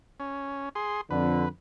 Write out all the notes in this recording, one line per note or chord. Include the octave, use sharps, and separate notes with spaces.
C#4
G#4 C6
F2 D3 B4